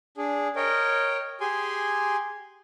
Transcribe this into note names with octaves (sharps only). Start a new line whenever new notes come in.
D4 G#4
A#4 C#5 D#5 G5
G4 G#4 G#5 C6